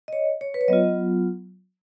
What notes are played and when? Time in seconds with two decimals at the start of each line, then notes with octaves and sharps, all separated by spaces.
0.08 D#5
0.13 C#5
0.41 C#5
0.54 B4
0.61 C#5
0.68 F#3 B3 F4 D#5